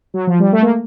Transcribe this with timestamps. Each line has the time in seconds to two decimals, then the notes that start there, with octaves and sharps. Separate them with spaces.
0.14 F#3
0.27 F3
0.40 G3
0.53 A3
0.62 A#3